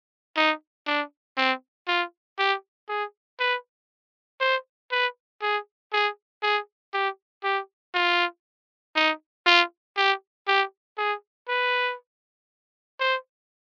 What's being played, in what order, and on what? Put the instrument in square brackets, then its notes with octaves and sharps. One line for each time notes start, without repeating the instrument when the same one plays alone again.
[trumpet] D#4
D4
C4
F4
G4
G#4
B4
C5
B4
G#4
G#4
G#4
G4
G4
F4
D#4
F4
G4
G4
G#4
B4
C5